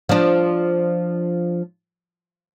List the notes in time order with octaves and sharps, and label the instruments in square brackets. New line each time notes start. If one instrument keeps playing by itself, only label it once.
[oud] F3 D4